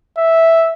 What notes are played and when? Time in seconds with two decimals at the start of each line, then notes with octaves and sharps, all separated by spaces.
0.18 E5